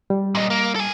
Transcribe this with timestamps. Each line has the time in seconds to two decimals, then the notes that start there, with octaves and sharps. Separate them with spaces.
0.10 G3
0.35 A#2 D#5
0.50 A#3
0.75 A4 G#5